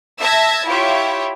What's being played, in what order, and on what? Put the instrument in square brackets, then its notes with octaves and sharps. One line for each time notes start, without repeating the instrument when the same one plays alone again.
[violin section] E5 A5 E6 G#6 A#6
E4 F4 G4 C#5 E5